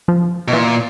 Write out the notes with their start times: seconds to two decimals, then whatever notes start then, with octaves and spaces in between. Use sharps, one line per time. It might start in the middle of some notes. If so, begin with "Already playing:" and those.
0.08 F3
0.48 B2
0.53 A#2 E3